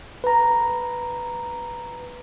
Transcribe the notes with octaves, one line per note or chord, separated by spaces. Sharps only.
B4 A#5